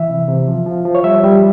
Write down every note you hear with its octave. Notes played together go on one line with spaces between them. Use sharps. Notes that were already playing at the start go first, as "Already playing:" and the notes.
Already playing: E3 E5
C3
C3
F3
F3
F3
C#5
G3 E5
G3